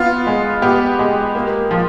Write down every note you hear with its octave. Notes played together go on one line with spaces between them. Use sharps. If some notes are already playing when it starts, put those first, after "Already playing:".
Already playing: B3 F4
G#3
B3 G4
G#3
A#3
F3